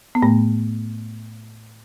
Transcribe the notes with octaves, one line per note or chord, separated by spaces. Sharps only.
B3
A2 A3